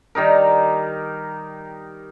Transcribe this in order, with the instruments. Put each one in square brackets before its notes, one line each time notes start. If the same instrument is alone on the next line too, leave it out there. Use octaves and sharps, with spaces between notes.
[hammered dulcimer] D#3 G3 D#4 A#4